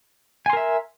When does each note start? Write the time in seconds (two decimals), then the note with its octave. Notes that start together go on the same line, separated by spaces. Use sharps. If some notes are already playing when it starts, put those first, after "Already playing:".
0.46 G#5
0.50 C6
0.53 A#4
0.57 E5